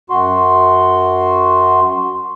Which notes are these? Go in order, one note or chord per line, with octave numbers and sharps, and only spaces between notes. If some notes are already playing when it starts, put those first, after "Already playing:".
F#2 F#4 C6